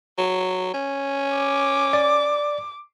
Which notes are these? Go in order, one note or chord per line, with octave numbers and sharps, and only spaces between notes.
F#3
C#4
D6
D5